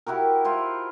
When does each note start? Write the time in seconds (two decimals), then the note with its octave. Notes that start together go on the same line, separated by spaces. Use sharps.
0.07 E4 F#4 G4 A#4
0.45 E4 F4 C5